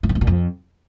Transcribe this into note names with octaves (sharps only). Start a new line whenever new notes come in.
A2
G#2
G2
A#2
F2